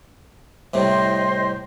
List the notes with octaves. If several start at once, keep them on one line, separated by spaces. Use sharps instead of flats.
C2 A2 C3 C5 D#5 C6